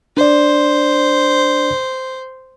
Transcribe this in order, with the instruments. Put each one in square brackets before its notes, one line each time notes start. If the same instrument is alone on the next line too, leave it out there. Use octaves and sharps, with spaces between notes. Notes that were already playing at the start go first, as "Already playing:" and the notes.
[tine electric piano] D4 D5 [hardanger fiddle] C5